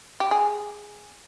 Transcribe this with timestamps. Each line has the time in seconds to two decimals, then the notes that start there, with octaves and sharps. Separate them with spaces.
0.20 G4
0.31 G#4